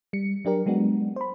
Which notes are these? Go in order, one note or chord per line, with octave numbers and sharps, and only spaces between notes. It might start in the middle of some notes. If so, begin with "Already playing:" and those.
G3 C#7
F#3 D4 G4 A#4
F#3 G#3 B3 D4 F#4
C5 B5